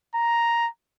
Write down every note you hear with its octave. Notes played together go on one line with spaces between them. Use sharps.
A#5